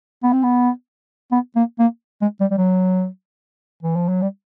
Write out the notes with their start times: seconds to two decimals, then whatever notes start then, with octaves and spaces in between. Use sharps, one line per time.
0.23 B3
0.33 C4
0.43 B3
1.32 B3
1.56 A#3
1.79 A#3
2.22 G#3
2.40 G3
2.51 G3
2.58 F#3
3.83 E3
3.96 F3
4.09 F#3
4.22 G3